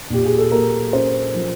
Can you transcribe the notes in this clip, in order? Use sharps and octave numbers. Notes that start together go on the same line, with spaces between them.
A#2 G4
G#4
A4
A#3 A#4
C#4 C5
F3